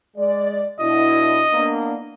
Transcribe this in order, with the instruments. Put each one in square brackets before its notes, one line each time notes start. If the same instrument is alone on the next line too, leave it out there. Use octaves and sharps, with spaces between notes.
[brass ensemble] G#3 D5
[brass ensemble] B2 D4 E4 [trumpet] D#5
[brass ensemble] A#3 B3 D4